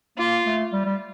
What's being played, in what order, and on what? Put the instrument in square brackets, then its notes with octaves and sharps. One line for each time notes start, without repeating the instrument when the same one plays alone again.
[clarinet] A#3 [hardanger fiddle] F4
[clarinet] A3
G3
G3